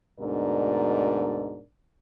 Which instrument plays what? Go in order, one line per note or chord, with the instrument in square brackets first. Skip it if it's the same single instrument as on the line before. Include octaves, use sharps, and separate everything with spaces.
[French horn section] D2 G#2 B2 D4 A#4 D5